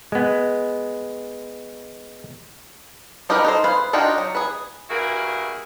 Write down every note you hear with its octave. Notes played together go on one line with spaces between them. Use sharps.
G#3 B3
C#4 D#4 G4 A#4 B4
D#4 A4 C5
G#4 B4 C5 F5
D4 D#4 F4 F#4 G5
F#3
G#4 B4
G2 A#2 E4 F#4 G#4 A#4